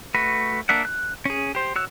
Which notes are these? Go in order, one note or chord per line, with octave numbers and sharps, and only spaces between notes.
A3 F#4 B4
A#3 D4 E5 F#5
F#6
C#4 G#4
G4 C5
F#4 C#5 E6 F#6